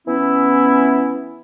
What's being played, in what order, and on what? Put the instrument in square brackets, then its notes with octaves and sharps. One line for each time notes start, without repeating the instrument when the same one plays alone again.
[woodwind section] E3 B3 C#4 E4